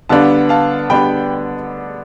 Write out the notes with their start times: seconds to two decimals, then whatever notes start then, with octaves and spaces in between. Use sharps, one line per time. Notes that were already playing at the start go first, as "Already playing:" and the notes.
0.09 D3 G3 B3 D4 F5 A5
0.49 F5 A5
0.90 D3 G3 B3 D4 G5 B5